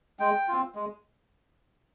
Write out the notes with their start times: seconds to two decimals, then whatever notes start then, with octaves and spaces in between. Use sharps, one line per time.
0.19 G#3 G5
0.48 C4 F4
0.75 G#3